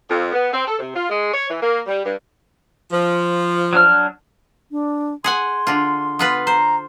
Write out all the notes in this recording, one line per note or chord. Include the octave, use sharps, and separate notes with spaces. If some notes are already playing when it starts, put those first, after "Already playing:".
F2
B3
C4
A4
C3
F4
G#3
C#5
E3
A#3
G3
G2
F3
F#3 D4 F6
D4
G#4 F#5 G#5 C6
D3 F4
B3 F4 B4
C5 A#5